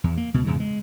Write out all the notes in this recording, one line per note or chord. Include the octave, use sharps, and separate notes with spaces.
E2
A#3
C#2 B2
E2 G#2 C#3
G#3